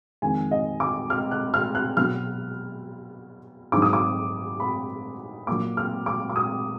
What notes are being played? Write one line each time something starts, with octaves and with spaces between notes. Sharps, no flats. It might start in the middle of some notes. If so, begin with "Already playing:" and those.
F2 D#3 G#3 G#5
D#5
D6
F6
F#6
F6
F#6
B2 F#3 F6
G#2 F#3 D6
D#6
D6
B5
A#2 F#3 D6
F6
D6
D6
D#6